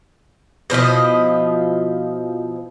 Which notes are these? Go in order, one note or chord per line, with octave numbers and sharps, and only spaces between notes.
B2 F3 E4 D#5